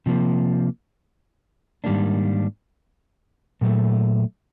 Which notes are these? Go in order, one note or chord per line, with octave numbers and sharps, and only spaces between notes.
C3 F3 A#3
G#2 D#3 G3 A#3 D4
A#2 F#3 A3